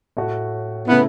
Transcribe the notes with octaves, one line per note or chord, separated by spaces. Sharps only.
A2 A3 F#4
C#3 A3 B3 E4